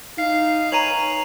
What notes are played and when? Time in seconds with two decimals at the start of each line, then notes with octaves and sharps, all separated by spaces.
0.18 D#4 F5 C7
0.72 B4 C#5 G#5 A#5 D#7 F7 F#7